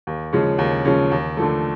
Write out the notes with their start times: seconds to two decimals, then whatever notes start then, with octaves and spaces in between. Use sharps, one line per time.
0.07 D#2
0.33 C#3 F3 G#3 C#4
0.59 D#2
0.85 C#3 F3 G#3 C#4
1.11 D#2
1.37 D3 F3 A3